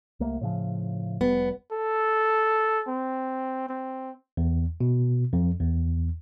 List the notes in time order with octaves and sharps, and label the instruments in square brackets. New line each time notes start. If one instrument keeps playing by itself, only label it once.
[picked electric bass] C2 A3 A#3
A2 C#3 F3
[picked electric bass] F1 G3 [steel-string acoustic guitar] B3
[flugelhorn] A4
C4
C4
[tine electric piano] E2
B2
F2
E2